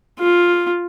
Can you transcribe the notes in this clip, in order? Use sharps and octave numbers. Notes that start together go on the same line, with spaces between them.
F4